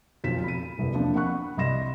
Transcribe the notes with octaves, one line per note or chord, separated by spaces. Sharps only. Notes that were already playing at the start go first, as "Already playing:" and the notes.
F1 B1 F4 B6 E7
B5 D#7
E1 C2 F2 E3
F3 A#3 C4 D4
F#5 B5 C#6 F#6
C2 D#5 B5 C6 A#6 E7